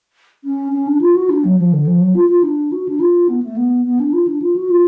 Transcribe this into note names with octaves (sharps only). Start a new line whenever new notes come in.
C#4
C#4
D4
F4
F#4
D4
F#3
F3
D3
F3
F#3
F4
F4
D4
F#4
D4
F4
B3
A3
B3
B3
D4
F4
D4
F4
F#4
F4